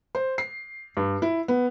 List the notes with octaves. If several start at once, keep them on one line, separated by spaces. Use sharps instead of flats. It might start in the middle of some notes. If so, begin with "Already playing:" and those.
C5
C7
G2
E4
B3